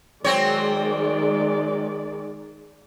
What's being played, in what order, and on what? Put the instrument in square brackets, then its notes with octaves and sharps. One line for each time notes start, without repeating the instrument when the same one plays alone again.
[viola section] D#3 G#3 D5 [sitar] F#3 C4 C#5